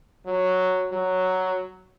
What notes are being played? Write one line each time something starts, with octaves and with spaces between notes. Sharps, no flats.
F#3
F#3